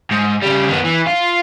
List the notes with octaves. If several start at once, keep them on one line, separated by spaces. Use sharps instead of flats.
G#2
C#3 G3
D#3 B3
E3
F4